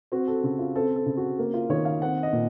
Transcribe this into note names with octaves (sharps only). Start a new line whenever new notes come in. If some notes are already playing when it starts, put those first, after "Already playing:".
C4 F#4
A4
C#3 F#4
F4
C4 A4
A4
C#3
F#4
A#3
F4
D#3 C#5
F5
C4 F#5
D#5
A#2